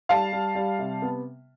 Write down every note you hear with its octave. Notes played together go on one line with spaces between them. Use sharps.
G3 F5 A5
G3
G3
C3
B3